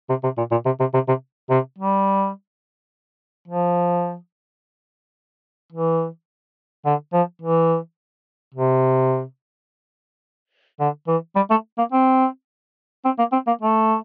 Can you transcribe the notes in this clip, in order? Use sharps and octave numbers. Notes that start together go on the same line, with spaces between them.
C3
C3
A#2
A#2
C3
C3
C3
C3
C3
G3
F3
E3
D3
F3
E3
C3
D3
E3
G3
A3
A#3
C4
C4
A#3
C4
A#3
A3